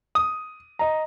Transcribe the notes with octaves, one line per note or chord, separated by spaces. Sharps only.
D#6
D#5 A#5